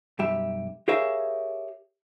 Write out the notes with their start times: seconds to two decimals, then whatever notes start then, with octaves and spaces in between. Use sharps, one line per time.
0.19 B1 F#2 G3 G4 E5
0.88 G4 G#4 A#4 C#5 E5 F5